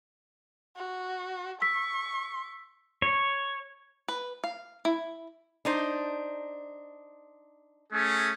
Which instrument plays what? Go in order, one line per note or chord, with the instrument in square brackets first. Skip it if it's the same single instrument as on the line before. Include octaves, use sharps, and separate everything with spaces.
[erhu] F#4
[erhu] C#6 [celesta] E6 B6
[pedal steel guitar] C#5
[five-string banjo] B4
F5
E4
[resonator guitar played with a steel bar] D4 D#4 C5
[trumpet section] A3 C#4 G#4